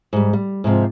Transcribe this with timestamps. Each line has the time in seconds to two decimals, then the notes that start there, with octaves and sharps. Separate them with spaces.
0.13 G#2 G3
0.33 G3
0.64 G#2 C3 F3